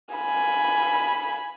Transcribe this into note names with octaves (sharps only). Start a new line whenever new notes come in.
G#5 B5